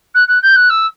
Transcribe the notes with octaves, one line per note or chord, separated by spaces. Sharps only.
F#6
F#6
G6
F#6
E6